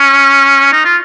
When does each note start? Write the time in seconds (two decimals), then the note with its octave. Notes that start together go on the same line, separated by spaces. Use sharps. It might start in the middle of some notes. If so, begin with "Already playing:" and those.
Already playing: C#4
0.72 D#4
0.85 F4